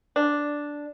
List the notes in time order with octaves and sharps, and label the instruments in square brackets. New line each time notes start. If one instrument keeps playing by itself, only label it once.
[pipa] D4